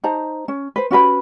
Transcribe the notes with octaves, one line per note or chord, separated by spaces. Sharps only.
D#4 C5 A5 A#5
C#4
B4 C5
C#4 F#4 B4 B5